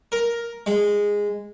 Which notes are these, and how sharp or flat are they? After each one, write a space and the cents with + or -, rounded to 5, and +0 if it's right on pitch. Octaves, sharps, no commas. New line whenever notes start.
A#4 +5
G#3 -10